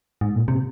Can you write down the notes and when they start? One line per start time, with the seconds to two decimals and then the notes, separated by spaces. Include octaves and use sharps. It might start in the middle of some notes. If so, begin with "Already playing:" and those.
0.21 G#2
0.35 A#2
0.48 C3